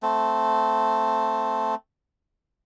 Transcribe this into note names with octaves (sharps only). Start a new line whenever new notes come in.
A3 C4